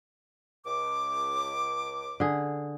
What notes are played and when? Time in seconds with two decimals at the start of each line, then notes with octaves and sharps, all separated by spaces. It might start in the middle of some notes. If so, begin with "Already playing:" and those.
0.66 C#2 D6
2.20 D3 G#4